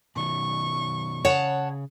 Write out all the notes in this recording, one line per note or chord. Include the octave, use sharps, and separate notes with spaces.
B2 D#3 F#3 C#6
C#3 G#4 C#5 F#5 A5